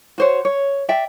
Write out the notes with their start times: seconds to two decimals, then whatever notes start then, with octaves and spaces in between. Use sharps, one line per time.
0.18 F#4 C5 C#5
0.45 C#5
0.88 D5 E5 G5